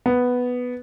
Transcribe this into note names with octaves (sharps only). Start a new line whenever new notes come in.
B3